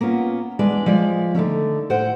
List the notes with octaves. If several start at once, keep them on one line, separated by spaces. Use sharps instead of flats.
A#3 B3 C#4 F4
E2 G#3 D4 B4 D5
F3 G#3 D5
D3 D#3 A3 C#4
A2 C5 F#5 G5